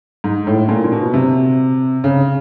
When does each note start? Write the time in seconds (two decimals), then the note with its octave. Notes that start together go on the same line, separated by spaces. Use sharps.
0.24 G#2
0.47 A2
0.69 A#2
0.84 A#2
0.92 B2
1.14 C3
2.04 C#3